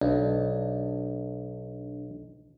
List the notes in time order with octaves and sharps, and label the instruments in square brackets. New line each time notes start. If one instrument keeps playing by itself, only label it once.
[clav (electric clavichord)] B1 [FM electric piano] D4